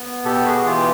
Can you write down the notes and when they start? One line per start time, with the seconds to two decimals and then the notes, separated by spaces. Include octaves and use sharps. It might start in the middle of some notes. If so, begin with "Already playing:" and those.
Already playing: B3
0.25 B2 G4 A4
0.45 F#4 G#4
0.65 E3 F4 G4